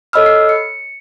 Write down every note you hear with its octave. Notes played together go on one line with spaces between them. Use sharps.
A4 C#5 D#5 B5 E6 F6
C7
C#7